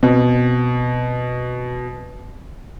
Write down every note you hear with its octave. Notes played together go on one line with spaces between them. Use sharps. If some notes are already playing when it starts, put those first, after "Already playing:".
B2 C4